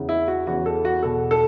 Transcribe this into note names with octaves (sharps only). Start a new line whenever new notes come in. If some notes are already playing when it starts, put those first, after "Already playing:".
Already playing: E2 C#3 E3
E4
F#4
E2 C#3 E3 F#4
A4
F#4
E2 B2 A4
A4